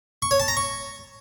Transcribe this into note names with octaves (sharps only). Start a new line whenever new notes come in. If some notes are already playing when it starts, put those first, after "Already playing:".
C#6
C#5
A5
A#5
C#6